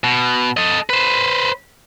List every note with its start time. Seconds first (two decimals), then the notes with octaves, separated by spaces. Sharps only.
0.04 B2
0.57 A4 D#5
0.90 B4 C5